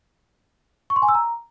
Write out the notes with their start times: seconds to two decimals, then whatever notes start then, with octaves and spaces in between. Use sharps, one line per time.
0.90 C#6
0.96 C6
1.02 G#5
1.08 E6
1.15 A#5